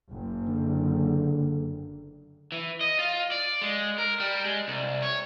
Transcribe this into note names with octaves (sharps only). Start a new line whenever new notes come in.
F#1
D3
E3
D#5
F4
D5
G#3
A#4
G3
G#3
C2
C#5